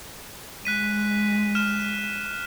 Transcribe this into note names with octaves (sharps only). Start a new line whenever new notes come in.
G#3 F#6 B6 D#7
F6 E7